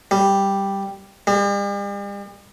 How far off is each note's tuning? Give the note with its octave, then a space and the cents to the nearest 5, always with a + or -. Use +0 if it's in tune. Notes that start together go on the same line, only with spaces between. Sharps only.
G3 +5
G3 +45